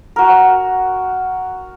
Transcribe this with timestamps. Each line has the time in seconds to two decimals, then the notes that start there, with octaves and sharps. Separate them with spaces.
0.16 F#4 A#4